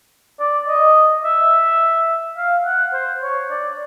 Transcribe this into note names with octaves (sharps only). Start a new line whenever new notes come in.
D5
D#5
E5
F5
F#5
C5
C#5
D5